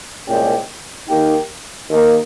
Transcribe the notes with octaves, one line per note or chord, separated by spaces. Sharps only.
C2 A#2 G#3 C#4 G4
D#3 A#3 D#4 G4
D#2 D#3 A#3 D#4 A#4